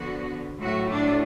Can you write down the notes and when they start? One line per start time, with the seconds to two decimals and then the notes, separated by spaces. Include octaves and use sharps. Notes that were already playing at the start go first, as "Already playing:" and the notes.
Already playing: D3 F3 B3 F#4
0.61 A2 F#3 A3 F#4
0.89 D4